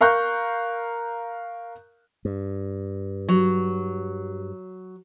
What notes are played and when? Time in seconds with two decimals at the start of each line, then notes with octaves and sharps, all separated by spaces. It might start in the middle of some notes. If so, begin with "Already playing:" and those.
0.01 A#4 F5 A#5 C#6 F#6 G6
2.25 G2
3.29 F#3